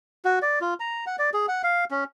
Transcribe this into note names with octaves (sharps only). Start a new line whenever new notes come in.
F#4
D5
F4
A#5
F#5
D5
G#4
F#5
F5
C#4